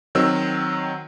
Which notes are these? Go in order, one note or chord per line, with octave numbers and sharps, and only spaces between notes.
D#3 F#3 C4 E6